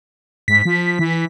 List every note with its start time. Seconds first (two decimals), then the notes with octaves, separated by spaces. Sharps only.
0.48 G#2 B6
0.65 F3
0.99 E3